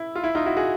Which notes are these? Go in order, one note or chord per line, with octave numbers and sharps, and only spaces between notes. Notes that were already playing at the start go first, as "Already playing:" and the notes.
Already playing: E4
F4
E4
D#4 F4
E4 F#4
F#4 G#4